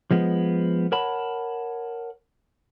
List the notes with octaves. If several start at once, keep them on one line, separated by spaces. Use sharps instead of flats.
F3 G#3 B3
A#4 C#5 F#5 A5 B5